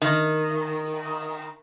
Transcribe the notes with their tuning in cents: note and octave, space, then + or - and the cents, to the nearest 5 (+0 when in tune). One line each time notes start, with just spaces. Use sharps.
D#3 -5